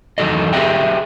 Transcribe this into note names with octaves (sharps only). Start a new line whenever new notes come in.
E2 D#3 F#3 F4 A4 D#5
G4 G#4 B4 D#5 E5 G5